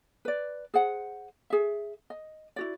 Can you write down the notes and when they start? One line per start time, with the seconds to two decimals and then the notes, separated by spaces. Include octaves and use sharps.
0.25 B4 D5
0.74 G#4 C5 F#5
1.50 G#4 E5
2.10 D#5
2.56 E4 F#4 D5